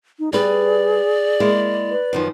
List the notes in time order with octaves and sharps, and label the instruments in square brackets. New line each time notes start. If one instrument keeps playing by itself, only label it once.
[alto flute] D#4
[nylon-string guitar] G3 B4 [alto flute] G#4 [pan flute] D5
[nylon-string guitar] G#3 A#3 E4
[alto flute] B4
[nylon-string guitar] F#2 D#3 F3